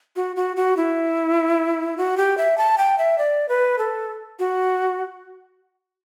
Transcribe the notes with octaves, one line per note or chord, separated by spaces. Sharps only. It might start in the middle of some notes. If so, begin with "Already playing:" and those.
F#4
F#4
F#4
E4
F#4
G4
E5
A5
G5
E5
D5
B4
A4
F#4